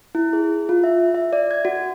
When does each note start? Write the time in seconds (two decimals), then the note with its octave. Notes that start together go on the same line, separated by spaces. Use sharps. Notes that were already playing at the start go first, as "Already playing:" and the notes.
0.15 E4
0.33 G#4
0.69 F4
0.84 E5
0.99 E5
1.15 E5
1.33 D5
1.51 G#6
1.65 F#4